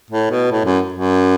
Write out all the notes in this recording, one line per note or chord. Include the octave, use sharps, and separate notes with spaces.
A2
B2
A2
F#2
F#2